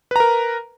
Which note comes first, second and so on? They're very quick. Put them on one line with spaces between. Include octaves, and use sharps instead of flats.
B4 A#5 A#4